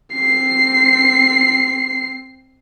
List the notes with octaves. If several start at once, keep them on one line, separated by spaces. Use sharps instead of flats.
C4 C7